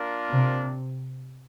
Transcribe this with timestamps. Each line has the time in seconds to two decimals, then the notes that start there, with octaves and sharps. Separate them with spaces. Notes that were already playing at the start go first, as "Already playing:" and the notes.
Already playing: A#3 D4 F4 A#4
0.29 C3